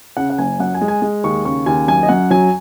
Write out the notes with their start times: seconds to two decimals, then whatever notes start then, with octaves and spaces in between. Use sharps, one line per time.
0.17 C#3 F#5
0.30 F#5
0.38 F#1 G#5
0.60 F#2 F#5
0.75 G#5
0.81 G#3
0.88 G#5
1.02 G#3
1.24 D#2 C#6
1.45 C#3 C#6
1.66 D#2 G#5
1.88 F#2 G#5
2.03 D#5
2.09 F#2 F#5
2.30 F#3 G#5